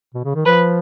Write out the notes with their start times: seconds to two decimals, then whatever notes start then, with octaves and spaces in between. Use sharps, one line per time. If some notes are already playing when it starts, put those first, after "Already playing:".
0.15 B2
0.25 C#3
0.35 D#3
0.45 F3 B4